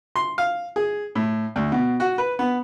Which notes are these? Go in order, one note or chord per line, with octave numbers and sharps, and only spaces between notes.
C6
F5
G#4
A2
D2
B2
F#4
B4
B3